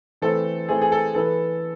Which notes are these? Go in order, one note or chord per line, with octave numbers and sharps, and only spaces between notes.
E3 A3 C4 A4
E3 A3 C4 G#4
G#4
A4
E3 B3 A4